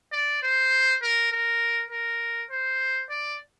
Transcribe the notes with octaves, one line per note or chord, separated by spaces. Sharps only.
D5
C5
A#4
A#4
A#4
C5
D5